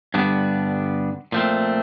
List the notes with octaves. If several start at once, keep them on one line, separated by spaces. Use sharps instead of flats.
G2 D3 G3 B3 D4
A#2 F3 A3 C4